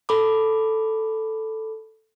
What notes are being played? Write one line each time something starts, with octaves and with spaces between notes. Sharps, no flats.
A4 B5 D6